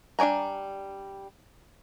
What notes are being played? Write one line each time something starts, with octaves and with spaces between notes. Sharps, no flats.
G3 D4 D5 G#5 A#5